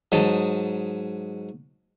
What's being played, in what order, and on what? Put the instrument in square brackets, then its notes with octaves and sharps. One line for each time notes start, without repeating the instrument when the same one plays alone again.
[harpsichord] G#2 F#3 D#5 A5